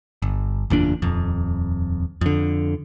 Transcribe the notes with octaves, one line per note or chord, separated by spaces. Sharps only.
G1
F#1 E2 A#2 D4
D#1 F2
F2 D3